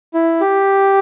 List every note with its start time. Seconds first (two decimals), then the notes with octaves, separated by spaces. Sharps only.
0.14 E4
0.41 G4